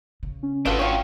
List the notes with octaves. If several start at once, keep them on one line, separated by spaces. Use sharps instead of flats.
C#3
C#4
G#1 D4 F4 F#4 A4 B4
F4 C#5 G5